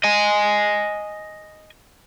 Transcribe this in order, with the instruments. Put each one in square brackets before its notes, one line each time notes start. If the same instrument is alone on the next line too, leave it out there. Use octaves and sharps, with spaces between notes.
[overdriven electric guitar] D#5 G#5